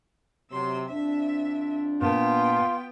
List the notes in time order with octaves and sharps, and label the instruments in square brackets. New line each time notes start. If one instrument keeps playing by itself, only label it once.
[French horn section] C3 F#3 [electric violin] C6 E6
[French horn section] F2 C4 D4 [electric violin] E5
[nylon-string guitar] A#2 A5 [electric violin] B3 G5 [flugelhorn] F4